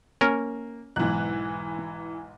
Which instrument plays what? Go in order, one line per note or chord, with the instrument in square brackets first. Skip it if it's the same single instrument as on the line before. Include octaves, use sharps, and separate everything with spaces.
[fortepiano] A#3 [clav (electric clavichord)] C#4 A#4
[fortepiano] B1 G#2 [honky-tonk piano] E3 F#6